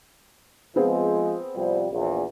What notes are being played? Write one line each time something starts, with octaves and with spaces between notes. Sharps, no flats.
F3 G#3 B3 C4 G#4
C2 F3 G3
A#1 E2